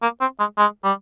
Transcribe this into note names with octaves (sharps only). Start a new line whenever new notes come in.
A#3
C4
G#3
G#3
G3